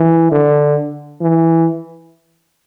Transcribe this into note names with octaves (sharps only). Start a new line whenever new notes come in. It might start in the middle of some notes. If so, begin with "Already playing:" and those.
Already playing: E3
D3
E3